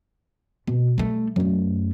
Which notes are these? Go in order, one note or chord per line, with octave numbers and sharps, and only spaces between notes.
B2
G3 A3
F#2 A3